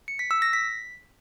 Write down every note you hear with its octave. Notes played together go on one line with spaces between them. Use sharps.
C#7
B6
E6
A#6
B6